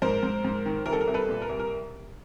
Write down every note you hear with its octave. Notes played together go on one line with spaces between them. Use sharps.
G#2 A#4 C5
G#2
G#2
D#3
C2 A#4
A4
A#4
C2
A4 B4
A#2
A#4
C2
A#4